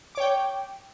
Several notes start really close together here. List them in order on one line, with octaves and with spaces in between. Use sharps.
D6 C#5 G5